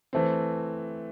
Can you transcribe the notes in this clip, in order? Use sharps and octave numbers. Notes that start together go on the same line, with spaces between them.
E3 A3 C4